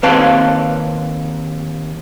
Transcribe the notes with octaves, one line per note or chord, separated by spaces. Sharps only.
D#2 C4 B4 C#5 F5 A5